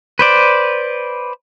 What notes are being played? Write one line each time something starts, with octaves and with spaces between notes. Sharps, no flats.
B4 C5 D5